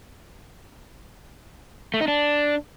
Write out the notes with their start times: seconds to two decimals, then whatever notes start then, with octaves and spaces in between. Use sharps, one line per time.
1.94 A3
2.01 D#4
2.08 D4